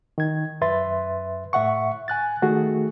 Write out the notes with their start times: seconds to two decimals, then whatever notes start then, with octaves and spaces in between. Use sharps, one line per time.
0.18 D#3 G#6
0.61 F#2 B4 E5 C6 A6
1.53 A2 E5 F#5 C#6
2.08 G#5 F#6 A6
2.42 D#3 A3 F#4 G#4